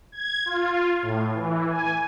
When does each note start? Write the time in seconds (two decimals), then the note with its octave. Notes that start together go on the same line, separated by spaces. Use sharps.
0.12 G#6
0.45 F4
1.02 A2
1.33 E3
1.69 G#5